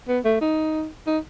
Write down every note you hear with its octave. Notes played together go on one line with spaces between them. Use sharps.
B3
A3
D#4
D#4